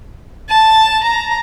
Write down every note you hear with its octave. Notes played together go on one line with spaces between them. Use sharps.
A5
A#5